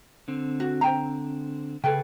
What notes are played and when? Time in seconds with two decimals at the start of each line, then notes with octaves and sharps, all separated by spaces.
0.28 D3 C4
0.60 F#4
0.81 C5 G5 A#5
1.84 C#3 G#4 A4 B4 G5